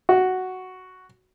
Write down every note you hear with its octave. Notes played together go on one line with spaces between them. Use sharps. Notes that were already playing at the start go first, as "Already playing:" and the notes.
F#4